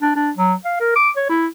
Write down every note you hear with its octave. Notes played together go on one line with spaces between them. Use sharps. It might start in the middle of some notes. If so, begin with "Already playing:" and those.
D4
D4
F#3
F5
A#4
D6
C#5
E4